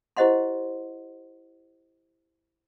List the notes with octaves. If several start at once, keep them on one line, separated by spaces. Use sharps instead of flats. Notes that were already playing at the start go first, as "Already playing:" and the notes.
E4 G4 C5 D#5 F#5 C6